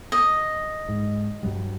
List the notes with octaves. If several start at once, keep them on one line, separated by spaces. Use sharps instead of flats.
D#5
G#2
G2 F#3 G3